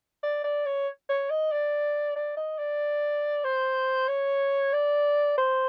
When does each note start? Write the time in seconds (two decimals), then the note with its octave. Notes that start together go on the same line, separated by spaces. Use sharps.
0.23 D5
0.44 D5
0.65 C#5
1.09 C#5
1.30 D#5
1.52 D5
2.16 D5
2.37 D#5
2.58 D5
3.44 C5
4.08 C#5
4.73 D5
5.38 C5